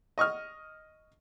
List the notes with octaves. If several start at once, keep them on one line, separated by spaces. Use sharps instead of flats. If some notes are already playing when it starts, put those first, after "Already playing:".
D#5 C#6 D#6 F6